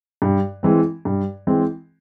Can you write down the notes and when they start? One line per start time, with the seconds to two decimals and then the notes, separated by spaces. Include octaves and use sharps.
0.22 G2
0.63 E3 G#3 C4
1.05 G2
1.47 E3 G#3 C4